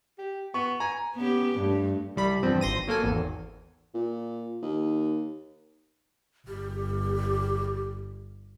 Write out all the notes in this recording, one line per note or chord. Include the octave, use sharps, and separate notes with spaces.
G4
B3 C#6
G#5 A#5
B3 C#4 G4
G2 A3
C2 G3 B5
E2 G2 F3 C4
G#1 C6 A#6 D#7
F#3 A#3 A4 G#5
G#1 E2
A#2
D#2
G1 G4